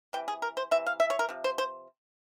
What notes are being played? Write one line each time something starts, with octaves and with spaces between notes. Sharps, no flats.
C3 E3 G5
G#4
A#4
C5
C3 E3 E5
F5
E5
C#5
A#4
C3 F3
C5
C5